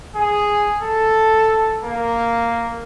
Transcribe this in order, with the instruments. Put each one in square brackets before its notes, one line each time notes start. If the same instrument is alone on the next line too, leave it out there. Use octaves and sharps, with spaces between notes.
[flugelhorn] G#4
A4
A#3